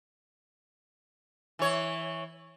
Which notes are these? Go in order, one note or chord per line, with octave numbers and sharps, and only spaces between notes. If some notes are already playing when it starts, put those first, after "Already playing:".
E3 C#5